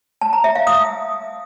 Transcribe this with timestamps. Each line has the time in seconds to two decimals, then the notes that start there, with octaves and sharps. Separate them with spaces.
0.21 A5
0.33 A#5
0.44 E5
0.55 F5
0.67 D#6